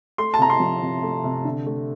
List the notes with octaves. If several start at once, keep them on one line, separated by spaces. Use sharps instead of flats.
A3 C6
A5
C3 A#5
C6
F3
C3
A3
C3
D3
A3